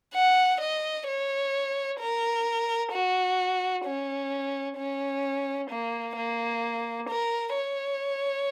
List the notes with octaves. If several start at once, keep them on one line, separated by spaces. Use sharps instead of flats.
F#5
D#5
C#5
A#4
F#4
C#4
C#4
A#3
A#3
A#4
C#5